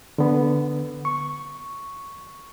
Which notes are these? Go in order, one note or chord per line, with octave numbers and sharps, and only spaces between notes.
D3 B3
C#6